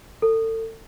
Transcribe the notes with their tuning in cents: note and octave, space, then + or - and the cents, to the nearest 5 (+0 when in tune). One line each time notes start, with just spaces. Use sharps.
A4 +30